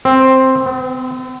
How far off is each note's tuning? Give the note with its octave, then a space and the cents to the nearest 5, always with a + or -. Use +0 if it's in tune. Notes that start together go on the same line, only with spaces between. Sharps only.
C4 +5
C4 -45